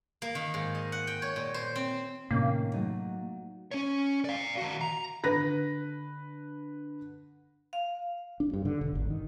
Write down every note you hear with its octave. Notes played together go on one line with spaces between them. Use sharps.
A#3
D#3
G#2
D#5
F#5
G5
C#5
A#2
C5
C4
A2 C3 D#3 A#3 C#4
F#3 A3 D#4
C#4 C#5
D5 F5
D#3 F#4
A#5
D3 B4 A#6
F5
D4
G2
D3
E1
G#1
D#3